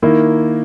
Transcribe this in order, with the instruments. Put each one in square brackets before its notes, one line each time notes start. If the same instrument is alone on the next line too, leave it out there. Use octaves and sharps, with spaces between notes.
[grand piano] D#3 A#3 E4